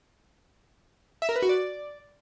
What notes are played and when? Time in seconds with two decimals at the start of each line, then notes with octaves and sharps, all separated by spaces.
1.22 E5
1.29 A#4
1.36 B4
1.42 F#4
1.49 D5